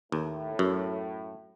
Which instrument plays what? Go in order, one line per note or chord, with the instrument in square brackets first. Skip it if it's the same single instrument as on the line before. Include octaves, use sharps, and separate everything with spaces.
[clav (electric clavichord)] D#2 [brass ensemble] A2
[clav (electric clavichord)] F#2